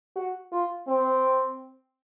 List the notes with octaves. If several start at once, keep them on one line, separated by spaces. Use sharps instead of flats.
F#4
F4
C4